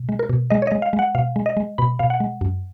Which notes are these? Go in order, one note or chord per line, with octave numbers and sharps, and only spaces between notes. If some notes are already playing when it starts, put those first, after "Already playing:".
Already playing: B2
G#3
A#4
B2
G#3 D#5
C#5
G#3 D#5
F5
G#3
F#5
B2 F5
G#3
D#5
G#3
B2 B5
B2 F5
F#5
G#3
F#2